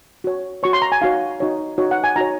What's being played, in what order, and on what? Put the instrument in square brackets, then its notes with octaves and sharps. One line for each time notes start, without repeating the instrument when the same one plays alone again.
[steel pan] F#4 C#5
F#4 C#5 C#6
C6
A#5
G#5
D#4 F#4 C#5 F5
D#4 F#4 C#5
D#4 F#4 C#5
F#5
G#5
D#4 F#4 C#5 A#5